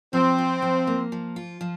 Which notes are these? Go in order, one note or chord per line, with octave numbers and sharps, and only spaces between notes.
F3 C4
F4
F3
A#3
F3
F4
F3